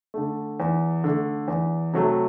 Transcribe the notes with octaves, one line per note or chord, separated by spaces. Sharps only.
D3 A3
E2
D3 A3
E2
C3 F#3 A3